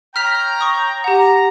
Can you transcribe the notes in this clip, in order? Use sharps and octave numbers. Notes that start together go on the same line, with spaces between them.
C#5 G5 A#5 F6 B6 F7
C#6 D#6
G4 F#5 A#5